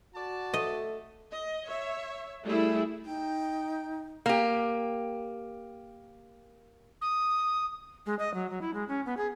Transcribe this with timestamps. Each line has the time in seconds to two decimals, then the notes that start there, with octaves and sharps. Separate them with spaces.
0.15 F#4 D5 A5
0.54 A3 D#5
1.31 D#5
1.67 C#5 E5
2.45 G3 A3 E4 G#4
3.05 D#4 G5
4.26 A#3 G4
7.02 D#6
8.06 G#3
8.19 D#5
8.34 F#3
8.50 F#3
8.62 E4
8.74 G#3
8.88 C#4
9.06 B3
9.17 G#4